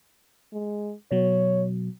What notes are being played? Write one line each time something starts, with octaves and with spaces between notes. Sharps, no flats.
G#3
B2 F#3 C#5